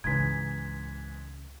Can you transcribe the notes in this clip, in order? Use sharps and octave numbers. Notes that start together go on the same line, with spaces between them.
C#2 G#2 C#3 E3 G#6 B6